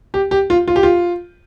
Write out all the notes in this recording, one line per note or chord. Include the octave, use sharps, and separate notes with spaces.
G4
G4
F4
F4
G4
F4